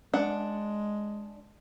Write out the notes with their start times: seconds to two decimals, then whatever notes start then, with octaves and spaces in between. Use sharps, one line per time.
0.13 G#3 D4 F#5